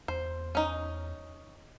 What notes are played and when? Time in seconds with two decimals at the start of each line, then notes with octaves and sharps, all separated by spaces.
0.08 E2 C5
0.55 C#4 D#4